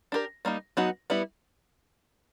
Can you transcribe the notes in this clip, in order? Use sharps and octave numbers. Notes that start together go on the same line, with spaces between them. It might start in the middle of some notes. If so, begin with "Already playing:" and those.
D4 G4 A#4
G3 A#3 D#4
F#3 B3 D#4 F#4
G3 B3 E4